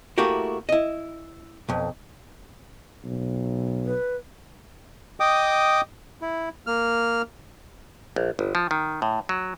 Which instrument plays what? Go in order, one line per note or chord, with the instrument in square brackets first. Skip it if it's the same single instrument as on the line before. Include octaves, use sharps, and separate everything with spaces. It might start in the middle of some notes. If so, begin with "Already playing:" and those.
[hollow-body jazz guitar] A3 A#3 E4 F#4 G4 A#4
E4 D#5
B1 F2
[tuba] B1
[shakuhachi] B4
[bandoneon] D#5 G5 D6 D#6
E4
A#3 F6
[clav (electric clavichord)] A#1
G1
F3
D#3
A2
F#3